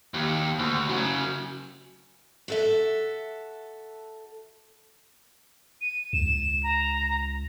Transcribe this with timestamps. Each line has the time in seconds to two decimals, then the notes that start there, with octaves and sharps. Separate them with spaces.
0.14 D#2
0.59 D2
0.89 C#3 F#3
2.48 F#4 A4 E5
5.81 D#7
6.13 C#2 E7
6.63 A#5